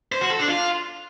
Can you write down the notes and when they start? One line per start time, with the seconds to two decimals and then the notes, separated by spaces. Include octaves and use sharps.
0.12 C5
0.21 F#4
0.30 A4
0.39 D4
0.48 F4